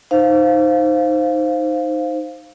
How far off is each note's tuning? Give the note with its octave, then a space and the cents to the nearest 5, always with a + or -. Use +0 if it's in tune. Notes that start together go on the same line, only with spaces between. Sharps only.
D#4 +0 C5 +0 F5 +0